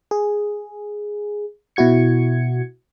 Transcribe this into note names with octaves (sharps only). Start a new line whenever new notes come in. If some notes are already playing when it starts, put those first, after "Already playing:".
G#4
B2 E4 F#4 G#6 C#7